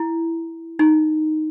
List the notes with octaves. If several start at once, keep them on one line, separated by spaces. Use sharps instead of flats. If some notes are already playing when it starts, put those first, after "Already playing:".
Already playing: E4
D#4